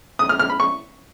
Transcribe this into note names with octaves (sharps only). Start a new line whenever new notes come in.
D#6
F6
F6
B5
C#6